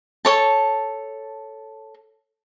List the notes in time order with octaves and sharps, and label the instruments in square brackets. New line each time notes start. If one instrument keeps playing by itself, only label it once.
[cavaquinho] A4 C#5 A5